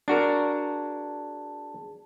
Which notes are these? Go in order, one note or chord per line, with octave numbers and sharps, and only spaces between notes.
D4 F#4 G#4 A#4 A5